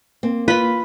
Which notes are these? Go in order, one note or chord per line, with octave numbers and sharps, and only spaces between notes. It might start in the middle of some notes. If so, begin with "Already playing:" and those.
A#3 C4
F4 B4 B5